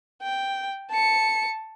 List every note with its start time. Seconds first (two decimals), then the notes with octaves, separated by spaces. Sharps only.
0.22 G5
0.91 A5 C#7